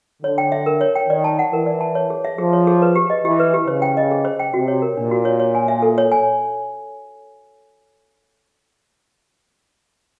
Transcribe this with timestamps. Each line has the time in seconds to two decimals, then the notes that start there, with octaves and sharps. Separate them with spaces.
0.23 D3 C#5
0.38 G5
0.52 E5
0.66 A#4
0.81 C#5
0.95 G5
1.09 D#3 D5
1.24 A5
1.39 F#5
1.53 E3 A#4
1.66 D5
1.81 A5
1.95 C#5
2.10 G#4
2.25 E5
2.38 F3 G#4
2.53 C#5
2.67 G#4
2.82 B4
2.96 G4
3.10 D#5
3.25 E3 G4
3.40 B4
3.54 G4
3.68 C#3 C5
3.82 G5
3.97 D#5
4.11 G#4
4.25 C5
4.40 G5
4.54 C3 F#4
4.68 C#5
4.82 A#4
4.97 A#2 D4
5.11 F#4
5.25 C#5
5.40 C#5
5.55 G#5
5.68 E5
5.82 A4
5.98 C#5
6.11 G#5